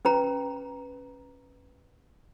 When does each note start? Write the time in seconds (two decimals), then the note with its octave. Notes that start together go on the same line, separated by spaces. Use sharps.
0.05 C#4 B4 A#5